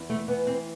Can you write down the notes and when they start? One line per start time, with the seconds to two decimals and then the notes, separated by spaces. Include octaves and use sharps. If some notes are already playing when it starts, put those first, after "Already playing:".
Already playing: E2
0.10 A3
0.28 E3 B3
0.47 C4